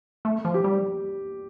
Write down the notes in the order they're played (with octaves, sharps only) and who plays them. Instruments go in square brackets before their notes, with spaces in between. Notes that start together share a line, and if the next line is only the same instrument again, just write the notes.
[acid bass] A3
F3
[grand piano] G4
[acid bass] G3